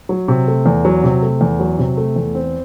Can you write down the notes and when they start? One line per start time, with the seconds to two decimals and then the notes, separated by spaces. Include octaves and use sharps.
0.09 F#3
0.28 C3
0.48 A3
0.66 E2
0.85 F#3
1.04 C3
1.22 A3
1.41 E2
1.60 F#3
1.79 C3
1.97 A3
2.16 E2
2.35 C4